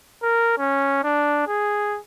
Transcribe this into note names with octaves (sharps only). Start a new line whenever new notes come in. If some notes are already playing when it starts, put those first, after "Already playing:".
A#4
C#4
D4
G#4